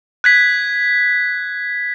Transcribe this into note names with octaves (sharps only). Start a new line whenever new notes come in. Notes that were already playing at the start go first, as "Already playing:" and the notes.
F#6 G#6 B6